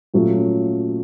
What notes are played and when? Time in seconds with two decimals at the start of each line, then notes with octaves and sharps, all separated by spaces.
0.14 A#2 F#3 A3 C#4 F4